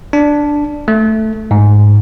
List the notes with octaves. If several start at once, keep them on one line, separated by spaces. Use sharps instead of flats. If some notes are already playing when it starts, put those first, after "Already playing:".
D4
A3
G#2